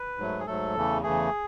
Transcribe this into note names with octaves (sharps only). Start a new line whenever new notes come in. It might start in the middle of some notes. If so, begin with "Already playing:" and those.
Already playing: B4
G#2 F#3 A3
G#4
G#2 F#3 A3 A4
E2 C#3 E3 A3
E2 C#3 E3 A3 G#4